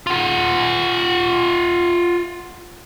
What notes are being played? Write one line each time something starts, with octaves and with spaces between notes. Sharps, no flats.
F4 F#5